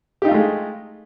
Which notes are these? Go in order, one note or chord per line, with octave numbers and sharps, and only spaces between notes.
G#3 A3 D#4 F4 G4